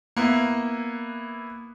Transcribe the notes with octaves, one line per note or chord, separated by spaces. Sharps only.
A#3 B3 E4